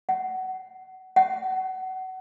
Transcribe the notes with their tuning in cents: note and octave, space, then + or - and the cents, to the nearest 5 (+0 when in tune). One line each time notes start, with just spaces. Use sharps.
F#5 +20
F#5 +25